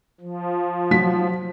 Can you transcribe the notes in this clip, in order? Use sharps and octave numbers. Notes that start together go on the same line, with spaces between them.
F3
F#3 B6